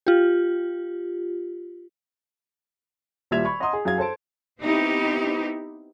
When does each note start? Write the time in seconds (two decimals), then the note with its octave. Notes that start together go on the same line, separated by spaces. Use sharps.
0.07 F4 G4
3.31 D#1 A#2 G3 E5 G#6 F7
3.45 B5 C#6 G#6
3.60 D#5 F#5 A#5 C6 D#6
3.73 G#4
3.85 F#2 G#4 F5 G#6
3.98 A4 C5 A5 D7
4.61 B3 C4 D#4 E4 G4